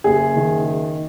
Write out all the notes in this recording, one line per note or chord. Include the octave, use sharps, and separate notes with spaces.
F#1 G#4
D#3